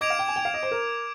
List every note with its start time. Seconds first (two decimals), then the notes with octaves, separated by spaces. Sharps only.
0.01 D#5 D6 G#6 D7 F7
0.10 F5
0.19 G5
0.28 G#5
0.36 G5
0.45 F5
0.54 D#5
0.63 C5
0.71 A#4